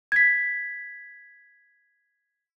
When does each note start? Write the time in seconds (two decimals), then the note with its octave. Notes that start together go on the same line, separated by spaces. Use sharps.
0.12 G#6 B6